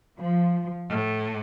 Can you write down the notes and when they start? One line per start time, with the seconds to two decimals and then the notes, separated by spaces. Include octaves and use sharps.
0.19 F3
0.89 A2